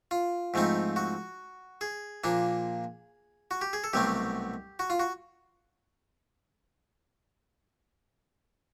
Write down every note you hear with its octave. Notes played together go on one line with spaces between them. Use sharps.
F4
G#2 F3 A3 C4 D#4
F#4
G#4
A#2 F3 A#3 D4
F#4
G4
G#4
A4
C2 B2 F#3 A3 C4 G4
F#4
F4
F#4